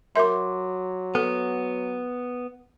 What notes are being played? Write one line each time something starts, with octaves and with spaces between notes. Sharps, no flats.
F#3 A#4 E5 C6 D6
B3 A4